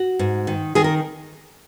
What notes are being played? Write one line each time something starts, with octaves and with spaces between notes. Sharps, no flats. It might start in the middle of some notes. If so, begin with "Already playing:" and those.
Already playing: F#4
G#2
D#3
D#3 G#4
A#4